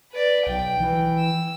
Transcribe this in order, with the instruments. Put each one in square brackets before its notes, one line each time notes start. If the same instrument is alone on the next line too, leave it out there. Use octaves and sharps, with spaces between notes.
[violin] B4 D5
[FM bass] B1 [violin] G5
[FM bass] E3
[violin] E6